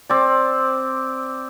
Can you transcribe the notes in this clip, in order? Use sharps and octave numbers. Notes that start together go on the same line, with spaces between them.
C4 D5